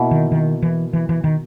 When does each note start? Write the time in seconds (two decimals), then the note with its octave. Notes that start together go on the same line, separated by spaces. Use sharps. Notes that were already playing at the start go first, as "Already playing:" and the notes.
Already playing: B2 A#3 E4
0.11 D#3
0.32 D#3
0.62 E3
0.93 E3
1.09 E3
1.24 D#3